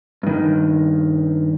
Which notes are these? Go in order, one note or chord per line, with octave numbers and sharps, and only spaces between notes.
G2 D#3